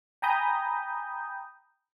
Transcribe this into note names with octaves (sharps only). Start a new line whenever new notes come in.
G5 G#5 A#5 B5 D#6 G6